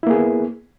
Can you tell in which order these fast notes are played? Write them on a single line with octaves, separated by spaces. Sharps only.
E4 A#3 G#4 B3